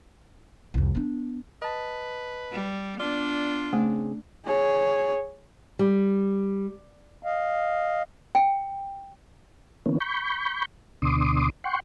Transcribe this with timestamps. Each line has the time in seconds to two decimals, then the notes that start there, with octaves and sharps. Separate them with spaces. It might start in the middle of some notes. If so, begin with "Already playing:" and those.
0.74 C2 F2
0.95 B3 D4
1.62 B4 D#5 A5
2.52 G3
3.00 B3 D4 F4 D5
3.73 C#3 A3 C4 G#4
4.46 G#4 C#5
5.79 G3
7.23 D#5 F5
8.35 G5
9.86 D3 E3 A#3 B3 C#4
10.00 B5 C#6 G6
11.02 D2 B2 D3 C6 D6 D#6
11.64 F#5 G5 C6 C#6